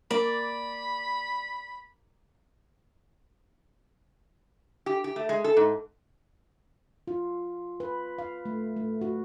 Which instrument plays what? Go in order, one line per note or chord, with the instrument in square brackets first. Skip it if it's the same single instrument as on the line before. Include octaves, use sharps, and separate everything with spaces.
[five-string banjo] A#3 [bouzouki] D5 [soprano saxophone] B5
[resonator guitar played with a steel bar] G4
G4
A3
G#3
A4
G#2
[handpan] F4
B4
F5
A3
A3
F#4